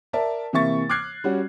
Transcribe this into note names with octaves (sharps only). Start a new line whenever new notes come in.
A#4 D5 E5 A5
C3 E3 A#3 E5 C#6 A6
D6 F6 F#6 G#6 C7
G3 C#4 F#4